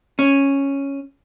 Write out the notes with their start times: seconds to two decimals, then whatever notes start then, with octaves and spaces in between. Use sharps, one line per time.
0.19 C#4